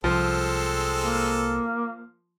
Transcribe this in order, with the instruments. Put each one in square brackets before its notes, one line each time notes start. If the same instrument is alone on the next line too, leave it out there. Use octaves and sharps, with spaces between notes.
[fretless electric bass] C2 [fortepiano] F3 [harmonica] G#3 C4 A4
[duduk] A#3